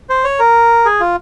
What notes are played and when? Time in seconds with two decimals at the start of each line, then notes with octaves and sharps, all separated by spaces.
0.10 C5
0.24 C#5
0.39 A#4
0.86 G#4
1.00 F4